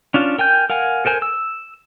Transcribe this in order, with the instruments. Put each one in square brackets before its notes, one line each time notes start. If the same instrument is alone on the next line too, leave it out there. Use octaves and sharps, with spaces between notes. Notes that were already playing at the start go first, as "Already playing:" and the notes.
[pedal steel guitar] C#4 D4 F4
A#4 G5 G#5 G6
A#4 F5 F#5 G#5
A4 A#4 C5 G#5
E6